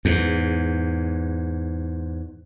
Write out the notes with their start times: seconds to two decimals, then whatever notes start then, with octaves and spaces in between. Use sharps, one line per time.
0.05 E2 G#2